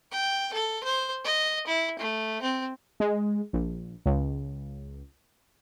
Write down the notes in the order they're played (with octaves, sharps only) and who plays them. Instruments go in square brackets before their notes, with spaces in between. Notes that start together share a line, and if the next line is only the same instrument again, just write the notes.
[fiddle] G5
A4
C5
D#5
E4
A3
C4
[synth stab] G#3
A#1
C#2